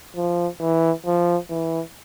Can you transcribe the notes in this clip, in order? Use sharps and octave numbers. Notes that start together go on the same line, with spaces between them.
F3
E3
F3
E3